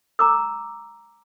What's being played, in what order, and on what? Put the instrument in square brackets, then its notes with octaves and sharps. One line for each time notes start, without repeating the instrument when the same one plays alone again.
[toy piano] A#5 D6 E6